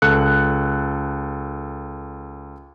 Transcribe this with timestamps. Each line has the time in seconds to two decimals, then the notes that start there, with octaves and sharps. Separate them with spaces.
0.02 C#2 A4 F#6 C#7